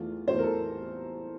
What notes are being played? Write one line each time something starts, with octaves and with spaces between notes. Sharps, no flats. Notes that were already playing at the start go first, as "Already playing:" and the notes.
Already playing: E2 E3 A3 F4
E2 E3 A3 C5
A#4
A4